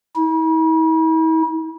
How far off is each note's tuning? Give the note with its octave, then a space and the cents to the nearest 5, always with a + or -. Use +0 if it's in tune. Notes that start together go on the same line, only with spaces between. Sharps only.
E4 -45